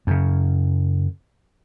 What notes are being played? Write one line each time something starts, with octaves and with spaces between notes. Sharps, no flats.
F#2 C#3